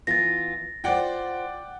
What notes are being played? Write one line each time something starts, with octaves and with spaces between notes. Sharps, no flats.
E3 B3 F4 A6 A#6
F4 C5 D5 F#5 G5